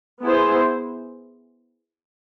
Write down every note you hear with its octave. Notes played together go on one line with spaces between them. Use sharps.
B3 E4 G#4 C5